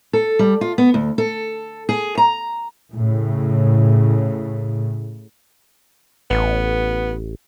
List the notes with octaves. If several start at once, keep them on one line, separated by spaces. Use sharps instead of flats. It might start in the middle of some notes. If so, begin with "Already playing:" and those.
A4
G3
F4
B3
D2
A4
G#4
A#5
A2 C#3
A1 B3